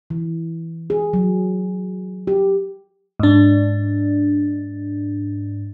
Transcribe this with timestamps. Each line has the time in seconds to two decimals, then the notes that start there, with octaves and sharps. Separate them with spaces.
0.10 E3
0.90 G#4
1.13 F#3
2.27 G4
3.20 G#2 D4